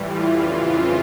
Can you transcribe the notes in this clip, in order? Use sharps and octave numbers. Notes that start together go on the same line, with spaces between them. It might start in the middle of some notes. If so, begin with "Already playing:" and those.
Already playing: A2 E3 G3 F4
F2 C#3 E3 F4